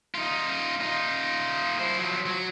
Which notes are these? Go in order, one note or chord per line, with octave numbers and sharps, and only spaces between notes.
D#4 F4
D#4 F4
E4 C5
F3 F#3
F#3